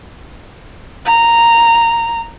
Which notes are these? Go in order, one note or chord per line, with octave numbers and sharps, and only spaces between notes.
A#5